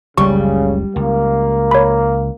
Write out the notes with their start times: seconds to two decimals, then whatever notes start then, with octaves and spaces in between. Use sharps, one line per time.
0.18 F#1 C#2 C#3 G3 C#6
0.96 C#2 A#3
1.71 C#5 B5